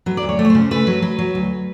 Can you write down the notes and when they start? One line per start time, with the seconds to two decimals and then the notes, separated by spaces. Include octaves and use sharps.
0.06 F#3 B4
0.17 D5
0.23 D2
0.29 C#5
0.39 A3
0.45 C#5
0.50 C#3 C5
0.71 A3 B4
0.87 F#3
1.02 F#3 B4
1.19 F#3
1.35 D2